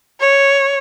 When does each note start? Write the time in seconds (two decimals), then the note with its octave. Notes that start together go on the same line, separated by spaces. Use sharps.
0.21 C#5